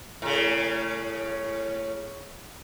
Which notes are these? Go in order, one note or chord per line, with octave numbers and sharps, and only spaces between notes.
A2 C#3